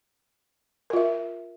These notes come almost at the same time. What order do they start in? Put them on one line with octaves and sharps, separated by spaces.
A#4 F4 E5